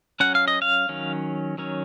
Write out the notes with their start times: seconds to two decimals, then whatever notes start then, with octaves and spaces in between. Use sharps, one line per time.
0.20 F#3 C#4 F#5
0.35 F5
0.48 D#5
0.62 F5
0.89 D#3 F#3 C#4
1.58 D#3 F#3 C#4